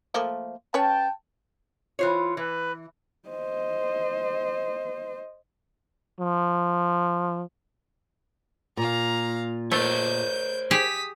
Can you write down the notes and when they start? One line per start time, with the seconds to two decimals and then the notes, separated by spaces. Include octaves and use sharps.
0.14 F3 A3 A#3
0.74 C#4 B4 C#5 G5 A5
1.99 E3 F4 C5 C#5
2.37 E3 B4
3.29 C5 D#5
6.20 F3
8.77 A#2 F5 A#5
9.72 A3 A#4 C5 C#5 G6
10.71 G4 G#4 D#6 B6